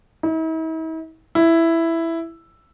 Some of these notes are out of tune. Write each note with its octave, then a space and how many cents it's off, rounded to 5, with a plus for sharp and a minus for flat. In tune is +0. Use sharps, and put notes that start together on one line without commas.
E4 -45
E4 +5